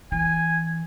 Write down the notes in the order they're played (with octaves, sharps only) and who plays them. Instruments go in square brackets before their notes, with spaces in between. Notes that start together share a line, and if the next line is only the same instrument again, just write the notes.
[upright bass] E3 [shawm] G#5